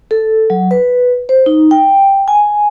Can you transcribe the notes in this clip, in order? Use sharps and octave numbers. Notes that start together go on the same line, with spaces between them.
A4
F#3
B4
C5
D#4
G5
G#5